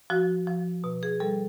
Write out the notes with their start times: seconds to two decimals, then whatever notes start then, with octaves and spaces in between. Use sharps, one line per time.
0.10 F3 F#4
0.47 F3
0.84 B2
1.03 G#4
1.20 G3 A4